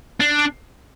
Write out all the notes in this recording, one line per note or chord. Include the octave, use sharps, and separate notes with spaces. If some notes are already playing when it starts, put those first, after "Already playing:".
D4